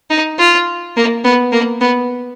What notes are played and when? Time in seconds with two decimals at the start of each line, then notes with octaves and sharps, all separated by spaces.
0.10 D#4
0.39 F4
0.96 A#3
1.25 B3
1.52 A#3
1.81 B3